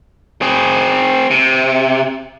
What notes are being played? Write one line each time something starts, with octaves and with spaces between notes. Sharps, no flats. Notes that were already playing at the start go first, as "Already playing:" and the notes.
C4 G#4
C3